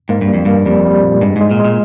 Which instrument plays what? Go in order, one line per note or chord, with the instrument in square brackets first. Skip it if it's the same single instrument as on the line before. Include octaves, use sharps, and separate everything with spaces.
[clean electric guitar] G#2 [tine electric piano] A#3
[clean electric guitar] G2
[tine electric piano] G3
[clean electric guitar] F2
[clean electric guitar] G2 [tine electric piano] A#3
[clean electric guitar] F2 [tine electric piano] G3
[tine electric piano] G3
A#2
[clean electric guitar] G2 [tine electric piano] G#3
[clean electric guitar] G#2 [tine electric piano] G#3
[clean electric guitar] A#2
[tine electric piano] G#3
[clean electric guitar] A#2